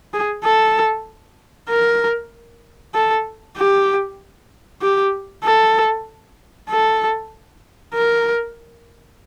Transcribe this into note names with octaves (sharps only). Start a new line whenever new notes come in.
G#4
A4
A#4
A4
G4
G4
A4
A4
A#4